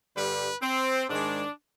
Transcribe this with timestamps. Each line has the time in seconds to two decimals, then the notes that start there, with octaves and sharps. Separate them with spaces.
0.16 G2 D3 G3 B4
0.62 C4
1.09 G#2 D#3 G#3 D4